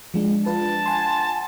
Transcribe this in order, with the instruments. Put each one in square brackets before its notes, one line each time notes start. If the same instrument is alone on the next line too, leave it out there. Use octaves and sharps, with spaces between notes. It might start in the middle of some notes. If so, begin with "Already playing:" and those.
[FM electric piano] F3 G#3 D4
[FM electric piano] D4 F4 B4 [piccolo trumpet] A5
[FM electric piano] F#5 G#5 C6